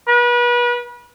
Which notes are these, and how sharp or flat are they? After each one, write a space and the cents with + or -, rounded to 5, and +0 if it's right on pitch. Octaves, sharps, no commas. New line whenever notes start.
B4 -35